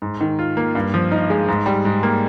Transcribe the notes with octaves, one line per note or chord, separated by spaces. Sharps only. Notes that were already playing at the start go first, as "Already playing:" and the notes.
G#2
D#3
F4
A#3
G2
F3
D#4
G#3
G#2
G3
G#2
A#3